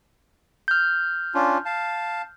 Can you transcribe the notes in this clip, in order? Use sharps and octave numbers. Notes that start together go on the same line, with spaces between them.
F6 G6
C#4 D4 F4
F5 A5